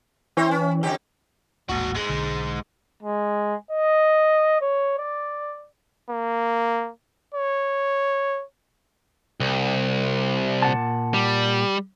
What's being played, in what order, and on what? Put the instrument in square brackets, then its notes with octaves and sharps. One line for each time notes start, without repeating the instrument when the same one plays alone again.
[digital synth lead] E3 [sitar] C4 C5 C#5
[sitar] C#4
F2 D3 G4
[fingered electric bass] D#1 A1 A#3 [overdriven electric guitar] G#2 F#4
[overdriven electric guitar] G#2 G#3
[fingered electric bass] B1 D3
[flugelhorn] G#3
D#5
C#5
D5
[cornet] A#3
C#5
[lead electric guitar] C2
[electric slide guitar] A#2 F#5 A5
[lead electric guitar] G3